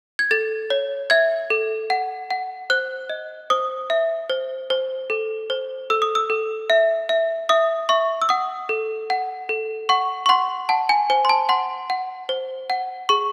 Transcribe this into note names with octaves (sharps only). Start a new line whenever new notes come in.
G#6
A4 A6
C#5
E5 G#6
A4
F#5
F#5
C5 F#6
D#5
C5 D#6
E5
C5
C5
A4
C5
A4 E6
D#6
E6
A4
E5
E5
E5 D#6
E5 C#6
E6
F#5 D#6
A4
F#5
A4
F#5 C#6
C#6
F#5 C6
F#5 A5
G#5
C5 G#5
C6
A5
F#5 C6
F#5
C5
F#5
G#4 C#6